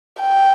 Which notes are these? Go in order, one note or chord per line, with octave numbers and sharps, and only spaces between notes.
G5